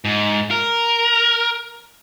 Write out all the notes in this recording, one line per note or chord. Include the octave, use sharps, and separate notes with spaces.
G#2
A#4